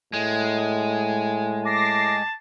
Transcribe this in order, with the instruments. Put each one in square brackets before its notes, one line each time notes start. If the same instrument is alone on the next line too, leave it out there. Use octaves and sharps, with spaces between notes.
[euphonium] A2 [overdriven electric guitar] G#3
[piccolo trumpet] A5 [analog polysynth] D6 A#6 C7